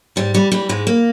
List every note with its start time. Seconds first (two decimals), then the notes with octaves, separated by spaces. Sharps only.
0.16 G#2 G3
0.34 E3 G3
0.52 E3 G3
0.69 G#2 G#3
0.87 A#3